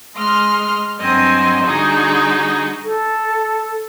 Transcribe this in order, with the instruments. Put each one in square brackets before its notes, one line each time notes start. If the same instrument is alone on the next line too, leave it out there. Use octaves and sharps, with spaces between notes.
[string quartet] G#3 D#5 C6 F6
G2 F#3 C4 D#5 G#5
D3 G3 D#4 F#4 G#4
[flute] A4